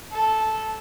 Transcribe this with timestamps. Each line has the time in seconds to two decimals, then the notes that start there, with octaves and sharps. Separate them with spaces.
0.11 A4